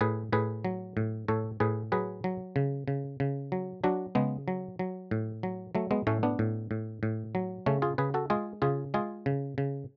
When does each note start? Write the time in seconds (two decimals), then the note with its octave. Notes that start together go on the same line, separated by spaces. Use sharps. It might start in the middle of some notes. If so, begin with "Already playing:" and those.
0.01 A2 G#4 B4
0.32 A2 G#4 B4
0.65 F#3
0.97 A2
1.28 A2 A4 C#5
1.60 A2 G#4 B4
1.92 F#3 G#4 B4
2.24 F#3
2.56 C#3
2.88 C#3
3.20 C#3
3.52 F#3
3.84 F#3 D4 F#4
4.15 C#3 G#3 B3
4.48 F#3
4.79 F#3
5.11 A2
5.43 F#3
5.75 F#3 A3
5.91 G#3 B3
6.07 A2 A3 C#4
6.23 B3 D4
6.39 A2
6.71 A2
7.03 A2
7.35 F#3
7.66 C#3 A3 C#4
7.82 F4 G#4
7.98 C#3 G#4 B4
8.14 F#4 A4
8.30 G#3 F4 G#4
8.62 C#3 F4 G#4
8.94 G#3 F4 G#4
9.26 C#3
9.58 C#3